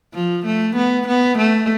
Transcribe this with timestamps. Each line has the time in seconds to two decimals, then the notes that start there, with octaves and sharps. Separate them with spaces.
0.14 F3
0.46 A3
0.76 B3
1.08 B3
1.38 A3